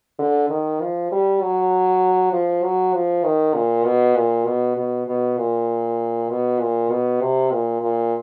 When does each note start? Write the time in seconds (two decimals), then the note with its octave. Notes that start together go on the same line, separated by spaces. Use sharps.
0.19 D3
0.50 D#3
0.80 F3
1.11 G3
1.41 F#3
2.33 F3
2.63 F#3
2.94 F3
3.24 D#3
3.54 A#2
3.85 B2
4.16 A#2
4.46 B2
4.77 B2
5.07 B2
5.38 A#2
6.29 B2
6.60 A#2
6.90 B2
7.21 C3
7.51 A#2
7.81 A#2